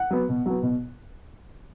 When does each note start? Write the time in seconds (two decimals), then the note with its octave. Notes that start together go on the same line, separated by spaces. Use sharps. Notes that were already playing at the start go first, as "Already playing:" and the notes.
Already playing: F#5
0.11 F#3 B3
0.29 B2
0.46 F#3 B3
0.63 B2